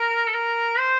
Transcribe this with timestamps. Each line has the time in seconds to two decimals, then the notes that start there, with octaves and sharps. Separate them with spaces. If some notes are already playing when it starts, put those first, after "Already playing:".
Already playing: A#4
0.28 A4
0.34 A#4
0.78 C5